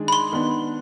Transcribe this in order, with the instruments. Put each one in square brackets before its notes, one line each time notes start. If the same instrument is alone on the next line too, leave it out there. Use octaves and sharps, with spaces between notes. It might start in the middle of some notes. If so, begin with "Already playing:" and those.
Already playing: [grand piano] D#3 G#3 D4 G#4
[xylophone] B5
C6
[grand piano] D#3 B3 D4